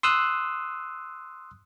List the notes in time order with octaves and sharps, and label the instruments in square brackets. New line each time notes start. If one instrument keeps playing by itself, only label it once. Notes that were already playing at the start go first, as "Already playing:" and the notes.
[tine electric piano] C6 D#6 E6 F#6